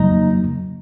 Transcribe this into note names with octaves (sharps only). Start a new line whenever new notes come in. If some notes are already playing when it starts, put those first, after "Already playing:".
Already playing: F2 C#3 F#3 A#3 D#4